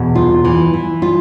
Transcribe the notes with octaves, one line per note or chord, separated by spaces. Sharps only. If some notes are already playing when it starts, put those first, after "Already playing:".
Already playing: E2 B2
F4
E3
E3
F4